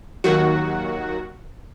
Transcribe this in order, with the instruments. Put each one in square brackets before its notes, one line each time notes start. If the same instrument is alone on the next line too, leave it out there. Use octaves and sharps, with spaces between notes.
[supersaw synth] D#2 D#3 F#3 F#4